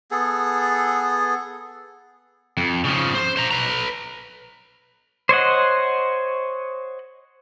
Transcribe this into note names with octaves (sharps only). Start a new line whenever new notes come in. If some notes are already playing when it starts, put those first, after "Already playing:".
B3 G#4 A4
F2
C#3 F3
C5
C5 A#5
B4 A#5
C5 C#5 D#5 F#5